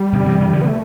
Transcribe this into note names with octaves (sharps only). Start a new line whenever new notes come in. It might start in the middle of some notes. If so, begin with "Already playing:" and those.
Already playing: G3
B2 D3
C3 E3
C3 E3
D3 F3
B3
A3